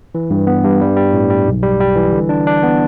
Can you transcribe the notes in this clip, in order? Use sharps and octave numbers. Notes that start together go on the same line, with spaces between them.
E3
G2
B3
G2
G3
G3
A2
G3
B1
G3
G3
E3
D3
D4
D4
B3